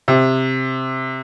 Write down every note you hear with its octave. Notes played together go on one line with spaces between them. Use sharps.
C3